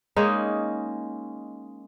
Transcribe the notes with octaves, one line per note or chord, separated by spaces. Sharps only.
G#3 A#3 C#4 D#4